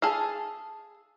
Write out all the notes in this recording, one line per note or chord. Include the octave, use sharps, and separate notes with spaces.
G#4 A4 F5